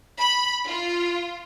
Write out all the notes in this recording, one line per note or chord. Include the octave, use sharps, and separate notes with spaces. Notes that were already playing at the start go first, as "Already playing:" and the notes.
B5
F4